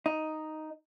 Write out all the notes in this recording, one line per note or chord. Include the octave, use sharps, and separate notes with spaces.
D#4